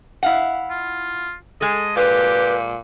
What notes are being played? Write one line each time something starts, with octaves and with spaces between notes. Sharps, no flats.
E4 F5 F#5
F4
G#3 A4 D#5
A#2 G4 B4